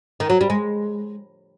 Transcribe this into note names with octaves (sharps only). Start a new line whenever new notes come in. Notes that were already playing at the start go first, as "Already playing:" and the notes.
D#3
F#3
G3
G#3